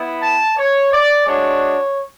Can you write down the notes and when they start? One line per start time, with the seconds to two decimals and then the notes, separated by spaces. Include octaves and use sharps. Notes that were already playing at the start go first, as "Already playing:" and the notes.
Already playing: B3 E4
0.23 A5
0.57 C#5
0.93 D5
1.26 G#3 D4 F#4 C#5